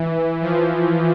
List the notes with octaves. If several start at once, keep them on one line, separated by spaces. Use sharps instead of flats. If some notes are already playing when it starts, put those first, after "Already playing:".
Already playing: E3
F3